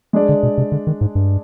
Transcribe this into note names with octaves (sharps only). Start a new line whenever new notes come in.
G#3 D4 G#4 D5
D3
B2
C3
D3
D#3
G#2
G2